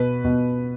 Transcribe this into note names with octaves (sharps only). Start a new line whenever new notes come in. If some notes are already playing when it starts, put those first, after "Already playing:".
Already playing: B2 B4
B2